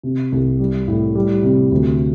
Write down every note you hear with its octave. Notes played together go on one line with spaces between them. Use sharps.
C3
C2
G3
A2
G3
C3
D2